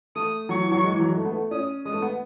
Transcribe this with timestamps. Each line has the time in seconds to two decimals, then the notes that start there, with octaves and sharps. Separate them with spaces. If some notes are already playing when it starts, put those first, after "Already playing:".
0.16 A3 D#6
0.49 F#3 C#6
0.61 E3
0.72 F#3
0.83 G#3
0.92 E3
1.00 F#3
1.09 G#3
1.17 A3
1.25 B3
1.32 A3
1.51 C#4 D#6
1.85 G#3 D#6
1.93 A3
2.02 B3